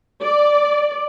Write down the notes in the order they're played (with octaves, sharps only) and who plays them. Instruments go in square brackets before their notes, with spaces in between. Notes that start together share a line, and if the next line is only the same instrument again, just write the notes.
[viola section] D5